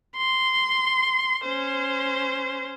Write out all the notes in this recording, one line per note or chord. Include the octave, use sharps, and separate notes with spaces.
C6
C#4 C5